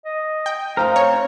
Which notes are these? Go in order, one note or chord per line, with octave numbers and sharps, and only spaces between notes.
D#5
G5
A3 D#4 A#4 C5 F5 A#5
C4 C#5